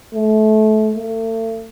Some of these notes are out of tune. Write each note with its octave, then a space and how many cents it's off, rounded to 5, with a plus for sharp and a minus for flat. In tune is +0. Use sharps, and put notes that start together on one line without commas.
A3 -25
A3 +40